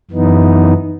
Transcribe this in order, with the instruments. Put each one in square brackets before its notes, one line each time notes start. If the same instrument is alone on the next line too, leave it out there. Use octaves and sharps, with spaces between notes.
[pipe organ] F#2 E3 B3 D#4